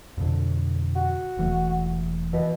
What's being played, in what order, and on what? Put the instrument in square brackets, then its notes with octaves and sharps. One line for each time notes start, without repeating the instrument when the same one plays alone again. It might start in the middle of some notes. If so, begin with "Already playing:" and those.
[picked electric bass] F2 B2 D3
[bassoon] F#4
[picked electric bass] E1 E3 A3
[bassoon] B2 [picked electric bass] E3